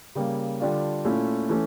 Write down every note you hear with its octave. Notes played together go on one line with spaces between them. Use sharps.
C#3 G3 A#3
D3 G3 D4 F4
A#2 A3 C#4 E4
E3 A3 C#4